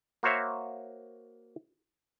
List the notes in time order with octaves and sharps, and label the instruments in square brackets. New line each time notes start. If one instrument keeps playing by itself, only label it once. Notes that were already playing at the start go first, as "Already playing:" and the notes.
[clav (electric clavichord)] A#3 F#4 C5 C#5 E5